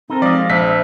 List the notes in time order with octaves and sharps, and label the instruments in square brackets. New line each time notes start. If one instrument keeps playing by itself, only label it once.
[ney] C4 [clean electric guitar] D#4 A4 A#4
[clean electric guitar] F3 G#3 D#5 [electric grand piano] D5 [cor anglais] F5
[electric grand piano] A#1 B6 [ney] C5 [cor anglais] E5